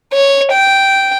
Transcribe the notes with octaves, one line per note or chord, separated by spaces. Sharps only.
C#5
G5